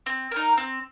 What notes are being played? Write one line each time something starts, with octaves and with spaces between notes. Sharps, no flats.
C4
D#4 A#4
C4